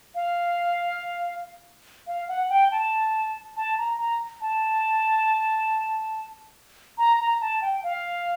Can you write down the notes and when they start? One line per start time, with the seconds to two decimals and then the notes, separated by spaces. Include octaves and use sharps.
0.15 F5
2.07 F5
2.28 F#5
2.50 G5
2.71 A5
3.56 A5
3.78 A#5
3.99 A#5
4.41 A5
6.98 A#5
7.19 A#5
7.41 A5
7.62 G5
7.83 F5